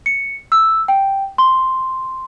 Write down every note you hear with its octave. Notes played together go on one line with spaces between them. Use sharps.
C#7
E6
G5
C6